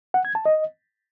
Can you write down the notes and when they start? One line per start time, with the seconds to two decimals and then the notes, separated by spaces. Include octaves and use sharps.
0.14 F#5
0.25 G#6
0.35 A5
0.45 D#5